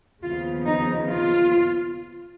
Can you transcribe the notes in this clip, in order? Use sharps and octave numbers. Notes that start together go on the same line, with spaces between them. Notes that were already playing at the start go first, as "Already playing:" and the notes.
D#2 C#3 F3 B3 F4
D#4
F4